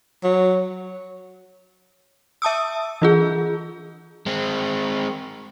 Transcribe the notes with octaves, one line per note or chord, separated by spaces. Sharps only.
F#3
E5 A5 D#6 E6
E3 F4 G#4
G#3 C4